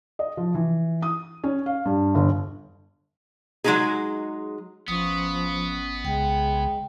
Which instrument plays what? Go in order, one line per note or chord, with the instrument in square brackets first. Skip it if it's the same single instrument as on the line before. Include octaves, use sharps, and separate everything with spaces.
[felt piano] D#5
F3
E3
D#6
C#4
F5
G2
G1
[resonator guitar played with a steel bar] F#3 G#3 A#3 C#4 D#4 G#4
[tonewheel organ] G#1 [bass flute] F3 [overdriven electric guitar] B3 [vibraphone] C#4 D#6
[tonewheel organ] C2 C#3 [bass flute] G#3 [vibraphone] G5